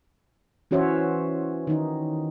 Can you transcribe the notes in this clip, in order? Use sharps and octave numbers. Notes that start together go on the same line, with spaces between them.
E3 C#4 F#4 C5 C#5 E5
D#3 D#4